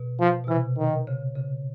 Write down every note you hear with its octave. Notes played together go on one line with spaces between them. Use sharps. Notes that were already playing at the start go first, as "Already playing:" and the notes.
Already playing: B2
F3
B2
C3 E3
D#3
C#3
C#3